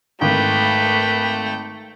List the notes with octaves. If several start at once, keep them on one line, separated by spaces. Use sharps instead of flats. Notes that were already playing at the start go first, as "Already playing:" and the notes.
G#1 A3 B4 G5